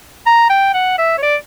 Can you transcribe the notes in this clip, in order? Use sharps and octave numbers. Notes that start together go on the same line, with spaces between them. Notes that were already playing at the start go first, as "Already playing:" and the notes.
A#5
G5
F#5
E5
C#5
D5